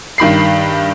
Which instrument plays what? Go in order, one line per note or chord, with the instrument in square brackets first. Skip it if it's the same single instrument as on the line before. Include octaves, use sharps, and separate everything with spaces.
[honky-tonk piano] G2 D#3 B5 C7